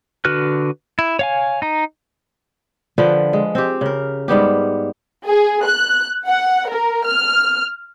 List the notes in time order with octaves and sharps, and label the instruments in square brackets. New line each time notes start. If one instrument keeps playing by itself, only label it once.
[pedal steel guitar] D3 F#4 B4 F6 F#6
E4
C#5 F5 G#5
D#4 A#5
[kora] D3 F3 B4 G5
G#3
C4 G4
C#3 A#4
G#2 G3 B3 G4
[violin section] G#4
F#6
F#5
A#4
F6